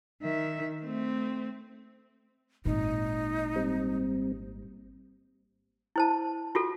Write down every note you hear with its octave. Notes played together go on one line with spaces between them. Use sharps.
D#3 E5
A3 C4
G#1 A#2 D#4
G3 C4
E4 C5 A5
F4 F#4 A4